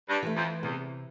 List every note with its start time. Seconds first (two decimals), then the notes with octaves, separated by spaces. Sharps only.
0.09 G2
0.23 E3 A3
0.36 F2
0.63 E2 C3